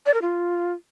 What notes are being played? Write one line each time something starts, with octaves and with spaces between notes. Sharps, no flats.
D5
A#4
F4